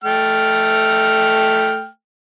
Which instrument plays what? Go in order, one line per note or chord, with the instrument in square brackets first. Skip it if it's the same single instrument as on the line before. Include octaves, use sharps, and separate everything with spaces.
[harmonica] A3 G5 F6